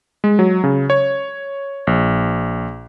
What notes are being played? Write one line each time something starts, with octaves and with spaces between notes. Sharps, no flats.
G#3
F#3
C#3
C#5
A#1